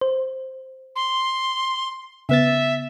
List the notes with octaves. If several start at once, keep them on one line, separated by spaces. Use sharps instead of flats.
C5
C6
C#3 B3 E5 A6